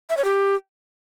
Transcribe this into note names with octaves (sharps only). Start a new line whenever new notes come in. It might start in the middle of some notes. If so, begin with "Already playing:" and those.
E5
C#5
G4